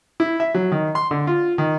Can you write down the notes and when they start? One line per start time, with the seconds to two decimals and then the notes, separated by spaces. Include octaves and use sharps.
0.20 E4
0.40 E5
0.54 F#3
0.72 D#3
0.95 C6
1.11 D3
1.27 F4
1.58 D#3